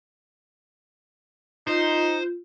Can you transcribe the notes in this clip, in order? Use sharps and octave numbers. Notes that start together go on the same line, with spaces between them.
D#4 F4 C5